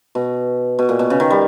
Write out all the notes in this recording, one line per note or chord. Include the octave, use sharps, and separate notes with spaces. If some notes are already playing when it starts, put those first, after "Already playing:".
B2
B2
A#2
B2
C#3
D#3
G3